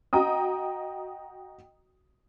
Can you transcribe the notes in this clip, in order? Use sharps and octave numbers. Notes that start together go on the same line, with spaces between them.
F#4 D#5 G5 A#5 D#6